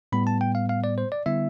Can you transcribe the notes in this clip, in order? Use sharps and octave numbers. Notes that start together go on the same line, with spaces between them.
A2 G3 B3 B5
A5
G5
F5
F5
D5
C5
D5
D3 G3 B3 E4 E5